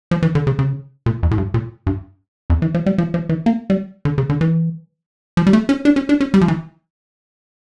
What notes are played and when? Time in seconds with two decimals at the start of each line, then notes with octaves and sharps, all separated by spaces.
0.11 F3
0.22 E3
0.35 D3
0.47 C#3
0.59 C#3
1.06 A#2
1.23 F2
1.31 A2
1.38 G2
1.54 A#2
1.87 G2
2.50 F2
2.62 E3
2.74 F3
2.86 G3
2.98 F3
3.14 F3
3.29 E3
3.46 A#3
3.70 G3
4.05 D3
4.18 C#3
4.30 D3
4.41 E3
5.37 F3
5.47 G3
5.53 A3
5.69 C#4
5.85 D4
5.96 C#4
6.09 D4
6.20 C#4
6.34 G3
6.41 F3
6.48 E3